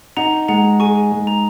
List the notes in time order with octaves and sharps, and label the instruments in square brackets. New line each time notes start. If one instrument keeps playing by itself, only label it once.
[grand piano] D#4 [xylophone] F#5 A#5
[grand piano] G#3 [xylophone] F#5 A#5
[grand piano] G#4 [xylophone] G#5 C#6
[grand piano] G#3
[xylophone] A#5